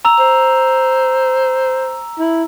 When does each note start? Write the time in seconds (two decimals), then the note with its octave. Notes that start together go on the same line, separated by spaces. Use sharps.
0.05 A#5 E6 F7
0.19 C5
2.19 E4